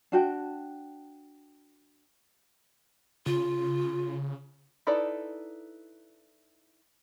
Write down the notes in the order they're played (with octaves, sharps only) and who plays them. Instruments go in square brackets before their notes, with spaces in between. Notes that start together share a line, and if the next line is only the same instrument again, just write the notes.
[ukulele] D4 F#4 G5
[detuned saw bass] C#3 [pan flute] F4
[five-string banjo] D#4 E4 A4 B4 D5